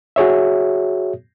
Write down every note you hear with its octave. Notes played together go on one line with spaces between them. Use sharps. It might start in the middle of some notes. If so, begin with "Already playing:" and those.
F#4 G#4 C#5 E5